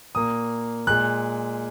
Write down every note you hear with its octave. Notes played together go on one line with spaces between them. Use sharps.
A#2 A#3 D#6
A#2 G#3 F#6